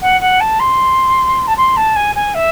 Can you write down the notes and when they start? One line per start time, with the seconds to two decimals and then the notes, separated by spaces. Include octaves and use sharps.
0.02 F#5
0.21 F#5
0.40 A5
0.60 C6
1.47 A5
1.57 C6
1.77 A5
1.96 G#5
2.15 G#5
2.35 E5